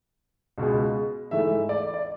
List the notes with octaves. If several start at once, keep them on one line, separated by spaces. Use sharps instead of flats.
C#2 B2 G#3
G#2 E3 A3 E5
D5
D5